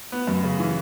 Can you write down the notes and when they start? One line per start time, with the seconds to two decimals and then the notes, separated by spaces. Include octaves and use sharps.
0.12 B3
0.27 F#2
0.44 C#3
0.59 E3